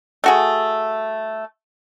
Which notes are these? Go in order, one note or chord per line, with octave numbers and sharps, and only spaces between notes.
A3 F#4 G#4